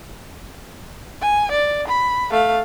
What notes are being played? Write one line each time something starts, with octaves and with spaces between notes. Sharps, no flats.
G#5
D5
B5
A3 F5